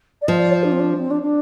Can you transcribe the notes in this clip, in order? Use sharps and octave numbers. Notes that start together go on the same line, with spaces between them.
D5
F3 D#5
D5
C5
D4
C4
D4
C4
D4
D4